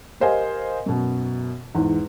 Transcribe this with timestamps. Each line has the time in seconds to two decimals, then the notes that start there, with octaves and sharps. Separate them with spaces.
0.20 G4 A#4 C5 D#5 F5 G#5
0.86 F#2 B2
1.75 E2 G#2